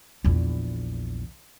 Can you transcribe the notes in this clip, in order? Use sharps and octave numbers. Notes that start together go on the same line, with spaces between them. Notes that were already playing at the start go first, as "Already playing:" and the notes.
A#1 E2